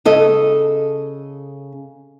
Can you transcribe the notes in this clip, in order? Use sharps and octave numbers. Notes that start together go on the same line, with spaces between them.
C#3 A4 D#5